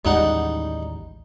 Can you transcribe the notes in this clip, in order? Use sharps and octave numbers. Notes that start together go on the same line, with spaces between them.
A1 D#2 G3 G#3 D#4 F#5